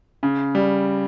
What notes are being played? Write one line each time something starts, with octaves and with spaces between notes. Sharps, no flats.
C#3
G3